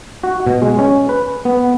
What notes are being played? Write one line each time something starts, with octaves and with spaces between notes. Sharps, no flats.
F#4
B2
G#3
C#4
B4
B3